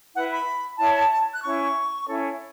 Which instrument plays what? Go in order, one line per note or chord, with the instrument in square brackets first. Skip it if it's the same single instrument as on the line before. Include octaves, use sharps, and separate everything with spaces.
[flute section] E4 B4 F#5
B5
E4 C#5 A5
A5
A5
F#6
C#4 E4 C#5 C#6
C#4 E4 A4 C#5